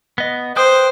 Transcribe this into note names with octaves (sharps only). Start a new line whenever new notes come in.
B3 D#5
B4 C5 G5 D#6